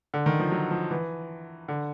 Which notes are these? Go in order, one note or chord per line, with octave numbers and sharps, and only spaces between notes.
D3
D#3
F3
F#3
F3
E3
D3